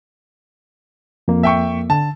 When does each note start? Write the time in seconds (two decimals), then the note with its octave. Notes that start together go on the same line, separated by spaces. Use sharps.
1.28 F2 A#3
1.43 E5 G5 C#6
1.90 D3 A5